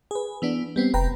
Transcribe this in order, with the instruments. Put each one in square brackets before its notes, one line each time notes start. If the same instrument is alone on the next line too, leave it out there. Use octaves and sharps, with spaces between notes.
[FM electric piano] G#4 B4
E3 B3 D4
G3 B3 C4
[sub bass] F1 [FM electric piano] B4 G5 A#5